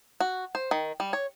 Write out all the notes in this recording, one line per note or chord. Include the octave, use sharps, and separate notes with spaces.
F#4
C5
D#3
G3
C#5